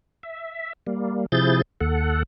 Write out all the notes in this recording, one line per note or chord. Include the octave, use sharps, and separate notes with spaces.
E5
G3 A#3
C3 F3 E4 G#4 G6 A6
D#2 A4 F#5